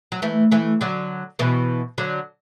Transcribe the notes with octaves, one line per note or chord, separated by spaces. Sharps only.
F#3
E3 A3
E3 A3
D3 F#3
B2 E3
D3 F#3